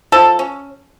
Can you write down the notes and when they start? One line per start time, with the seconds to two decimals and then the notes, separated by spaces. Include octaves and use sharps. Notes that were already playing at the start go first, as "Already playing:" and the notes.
0.12 F3 A4
0.39 C#4